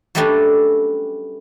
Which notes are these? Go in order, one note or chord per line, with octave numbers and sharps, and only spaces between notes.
F#3 G3 A3 B3 C#4 D4